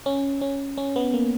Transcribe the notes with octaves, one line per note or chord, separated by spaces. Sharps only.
C#4
C#4
C#4
B3
A#3